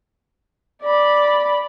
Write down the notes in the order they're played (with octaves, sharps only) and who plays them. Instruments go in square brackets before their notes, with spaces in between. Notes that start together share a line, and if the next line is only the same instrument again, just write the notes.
[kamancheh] D5 B5